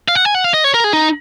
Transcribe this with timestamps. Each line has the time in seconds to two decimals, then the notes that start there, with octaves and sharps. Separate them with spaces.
0.08 F5
0.15 F#5
0.25 G#5
0.34 F#5
0.44 F5
0.54 D#5
0.64 C#5
0.74 A#4
0.84 G#4
0.93 D#4